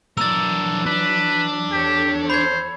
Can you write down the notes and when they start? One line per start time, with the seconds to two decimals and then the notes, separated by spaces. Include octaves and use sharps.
0.17 E3 F#3 D4 A#4 E6 A6
0.86 D4 B4
1.72 E2 G4 A4 C#5
2.30 C5 B5 G#6